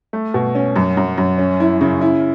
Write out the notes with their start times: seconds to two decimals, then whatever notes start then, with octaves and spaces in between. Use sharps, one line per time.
0.13 A3
0.34 B2
0.55 C#4
0.76 F#2
0.97 F#2
1.18 F#2
1.38 C#4
1.60 E4
1.81 C#3
2.01 E4